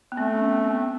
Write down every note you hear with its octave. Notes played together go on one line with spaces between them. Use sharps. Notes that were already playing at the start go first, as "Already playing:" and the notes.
B3
A3 C4
C#4
B3
C4
C4
B3